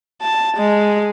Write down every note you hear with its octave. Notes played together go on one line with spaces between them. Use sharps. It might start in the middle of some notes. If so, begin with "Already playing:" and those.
A5
G#3